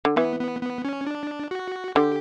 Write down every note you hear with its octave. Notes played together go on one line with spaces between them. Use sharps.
D3
E3 B3
B3
B3
C#4
D4
F#4
D3 G4